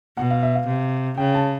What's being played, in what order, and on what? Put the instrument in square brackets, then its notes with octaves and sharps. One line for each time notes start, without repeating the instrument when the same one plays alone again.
[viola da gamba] B2 [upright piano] F#5
[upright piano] F5
E5
F5
[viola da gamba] C3
[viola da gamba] C#3 [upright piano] G5
[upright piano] A5